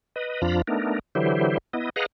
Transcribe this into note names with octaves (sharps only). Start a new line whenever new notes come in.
B4 D#5
F2 F3 D4 F4 A#5 B5
A3 B3 D4 D#4 A#4
D3 E3 F#3 E4 G4 C5
B3 E4 D#5
G#4 B4 D#5 F5 F#5 A#5